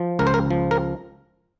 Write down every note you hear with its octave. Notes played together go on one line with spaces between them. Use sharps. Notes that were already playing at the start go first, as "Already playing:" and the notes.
Already playing: F3
C#2 A#4
C5
A#4
F3
A#4